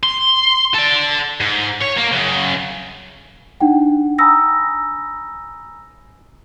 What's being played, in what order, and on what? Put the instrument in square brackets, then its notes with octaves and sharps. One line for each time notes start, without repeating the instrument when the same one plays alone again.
[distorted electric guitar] C6
A4 D5
G#2
C#5
A#3
F#2 C#3
[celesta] D4 D#4 F#5 G5
G#5 A#5 B5 D#6 E6 A#6